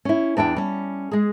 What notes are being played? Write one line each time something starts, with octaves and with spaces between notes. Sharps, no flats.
C#4 E4
E2 D4 E4 G5
G3 C#4
G#3 G#4